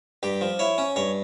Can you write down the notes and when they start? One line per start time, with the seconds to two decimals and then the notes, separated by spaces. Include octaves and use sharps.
0.23 G2 G4
0.41 F3
0.59 E4 C#5
0.78 C#4
0.96 G2 C#5